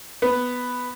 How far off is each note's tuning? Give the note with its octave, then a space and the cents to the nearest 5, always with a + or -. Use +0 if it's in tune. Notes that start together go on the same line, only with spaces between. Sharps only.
B3 +0